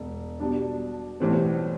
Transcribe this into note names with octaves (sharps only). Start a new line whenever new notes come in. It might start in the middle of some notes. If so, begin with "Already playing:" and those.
Already playing: E1
B2 G3 D4
B1 A2 E3 G3 C4